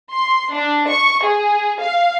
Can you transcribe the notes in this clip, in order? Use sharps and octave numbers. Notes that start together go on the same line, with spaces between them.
C6
D4
C#6
G#4
F5